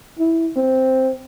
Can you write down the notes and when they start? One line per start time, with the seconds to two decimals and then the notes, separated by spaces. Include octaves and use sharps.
0.19 E4
0.57 C4